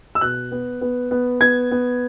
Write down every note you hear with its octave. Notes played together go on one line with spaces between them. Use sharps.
E6
B2 F#6
B3
B3
B3
B3 G#6
B3